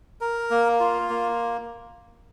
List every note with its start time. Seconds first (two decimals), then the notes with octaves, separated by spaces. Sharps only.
0.21 A#4
0.50 A#3
0.80 F4
1.10 A#3